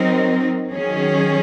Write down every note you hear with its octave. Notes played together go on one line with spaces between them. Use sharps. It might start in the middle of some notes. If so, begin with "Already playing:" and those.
Already playing: F#3 C4 D#4 A#4
D#3 F#3 C#4 G#4